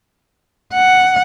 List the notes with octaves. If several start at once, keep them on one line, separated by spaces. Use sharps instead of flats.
F#5